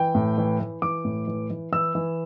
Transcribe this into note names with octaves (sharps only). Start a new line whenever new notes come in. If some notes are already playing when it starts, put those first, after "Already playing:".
Already playing: E3 G5
A2
E3
E3
E3 D6
A2
E3
E3
E3 E6
E3